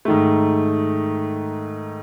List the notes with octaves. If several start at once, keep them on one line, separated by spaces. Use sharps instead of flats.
G#2 D#3 A3